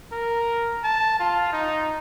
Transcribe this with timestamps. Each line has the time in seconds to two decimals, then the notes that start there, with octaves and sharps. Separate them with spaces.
0.13 A#4
0.84 A5
1.20 F4
1.53 D#4